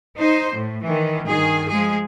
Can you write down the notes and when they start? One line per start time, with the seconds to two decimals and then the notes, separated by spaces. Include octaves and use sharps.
0.16 D#4 C5
0.54 A2
0.84 D#3 E3
1.27 G2 D#3 G#4
1.69 F3 G#3 G#4